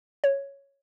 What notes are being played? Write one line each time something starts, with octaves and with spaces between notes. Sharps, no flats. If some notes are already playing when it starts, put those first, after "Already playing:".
C#5